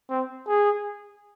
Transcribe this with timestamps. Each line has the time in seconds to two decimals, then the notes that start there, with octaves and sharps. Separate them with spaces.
0.09 C4
0.47 G#4